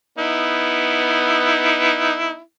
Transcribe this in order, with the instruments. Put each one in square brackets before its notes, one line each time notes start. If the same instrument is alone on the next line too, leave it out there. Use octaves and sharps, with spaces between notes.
[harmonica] B3 D#4 E4